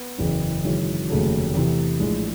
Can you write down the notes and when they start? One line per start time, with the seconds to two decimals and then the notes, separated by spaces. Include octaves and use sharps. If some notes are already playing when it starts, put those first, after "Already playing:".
Already playing: B3
0.18 F#1 E2 C#3 E3
0.64 G#1 F#2 C#3 E3
1.09 F1 D#2 C#3 F#3 A3
1.54 E2 C3 E3
2.00 A#1 A2 E3 G#3